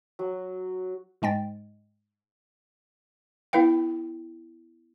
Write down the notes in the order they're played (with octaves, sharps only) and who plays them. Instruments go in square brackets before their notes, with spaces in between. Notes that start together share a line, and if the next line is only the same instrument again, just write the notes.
[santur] F#3
[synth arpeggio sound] G#2 G#3 G5 A6
[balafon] B3 E4 B4 F5 G5